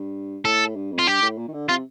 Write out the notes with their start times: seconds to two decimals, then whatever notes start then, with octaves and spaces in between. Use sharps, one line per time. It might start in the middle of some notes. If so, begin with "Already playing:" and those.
Already playing: G2
0.45 A2 A4
0.76 G2
0.92 F2
0.99 F4
1.07 G2 G4
1.22 A2
1.38 A#2
1.48 D#3
1.53 D3
1.69 C3 F4